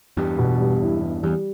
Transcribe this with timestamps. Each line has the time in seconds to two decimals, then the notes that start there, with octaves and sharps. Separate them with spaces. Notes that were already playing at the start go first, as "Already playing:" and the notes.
0.17 E2 G2 G4
0.39 B2
0.60 G3
0.81 E4
1.02 E3
1.23 E2 G3